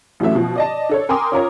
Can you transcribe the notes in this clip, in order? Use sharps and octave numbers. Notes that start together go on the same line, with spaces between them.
A1 E3 F#3 A3 E5
B2 F3
D5 D#5 A5
D4 A4 C#5
A#4 G5 G#5 C6 D6 D#6
C#4 F4 A#4 C#5